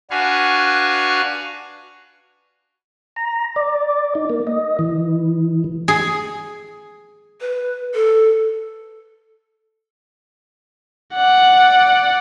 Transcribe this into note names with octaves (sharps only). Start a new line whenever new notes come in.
D4 F#4 B4 F5 G#5 C#6
A#5
D5
D#4
A#3
D#5
E3
G#4
B4
A4
D5 F#5